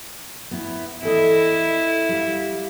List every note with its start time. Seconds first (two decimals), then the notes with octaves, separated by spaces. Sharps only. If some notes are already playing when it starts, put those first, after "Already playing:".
0.51 B3 E4
1.03 E2 E4 A4 D#5
2.09 G3 F5